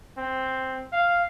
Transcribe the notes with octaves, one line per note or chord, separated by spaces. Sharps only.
C4
F5